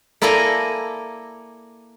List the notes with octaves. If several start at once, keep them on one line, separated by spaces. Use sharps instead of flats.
A#3 E4 A4 D5 G#5 A#5